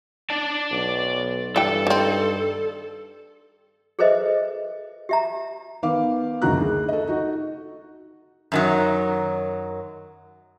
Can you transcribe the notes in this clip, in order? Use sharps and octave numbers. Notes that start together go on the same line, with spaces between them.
D5 A5
B1
G2 E3 A4 G5
D#3 C4
G#4 A4 B4 C5 D#5 E5
G4 E5 A#5
D#3 B3 F5 D6
F#1 D2 D#4 F#4 A#5 F#6
D2 G#4
A4 D#5
D#4 F#4
F#2 D#3 F#3